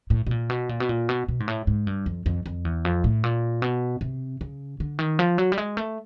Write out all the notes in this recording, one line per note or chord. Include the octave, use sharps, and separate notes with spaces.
A2
B2
A#2
B2
A#2
B2
A#2
B2
B2
G#2
A2
G#2
G2
F2
F2
F2
E2
F2
A2
A#2
B2
C3
C#3
D3
D#3
F3
F#3
G3
G#3
A3